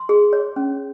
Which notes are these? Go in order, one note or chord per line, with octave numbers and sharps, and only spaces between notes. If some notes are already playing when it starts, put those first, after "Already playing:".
Already playing: C6
G#4
C#5
C#4